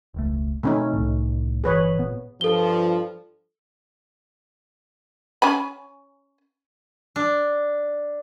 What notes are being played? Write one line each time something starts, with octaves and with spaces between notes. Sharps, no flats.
E1 C#2 A3
B2 D#3 A3 C4 C#4 D#4
C2 A2
G1 E3 G#4 B4 C#5
A#2 B3
G2 F3 A4 G7
C#4 G#5 B5
D4